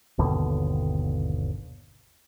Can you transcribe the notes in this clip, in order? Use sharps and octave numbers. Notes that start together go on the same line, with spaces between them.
G1 D#2 B2 D3